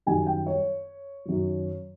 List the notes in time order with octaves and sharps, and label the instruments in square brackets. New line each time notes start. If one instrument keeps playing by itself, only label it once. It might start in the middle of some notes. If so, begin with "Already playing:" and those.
[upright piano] F#2 D#3 G3 G#5
G5
C#5
F#2 D#3 F#3